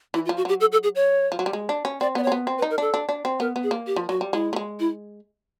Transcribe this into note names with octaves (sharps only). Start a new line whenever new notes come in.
E3 E4
F4
F3
F#4
F#3 G4
A4
A4
G#4
C#5
F3
F#3
G3
G#3
D4
C#4
C4 D5
B3 D5
C#5
C4
B3
C4
B4
D#4
A#4
D4 A4
D4
D4
C4
B3 A#4
B3
G#4
A#3
G4
F3
F#3 F#4
G3
G#3 E4
A3
G#3
E4